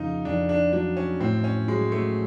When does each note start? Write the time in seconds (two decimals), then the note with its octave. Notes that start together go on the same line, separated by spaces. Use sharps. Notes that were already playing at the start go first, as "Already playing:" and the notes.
Already playing: F2 C#3 D#4 F4
0.25 F2 D4
0.49 D4
0.73 F#3 D4
0.97 C#4
1.20 A2 C4
1.44 C#4
1.68 F#3 G#3
1.92 A3